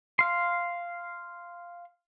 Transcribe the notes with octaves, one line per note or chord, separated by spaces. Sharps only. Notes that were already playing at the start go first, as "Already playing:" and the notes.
F5 C6